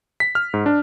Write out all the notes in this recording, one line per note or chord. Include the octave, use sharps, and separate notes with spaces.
B6
F6
G#2
D4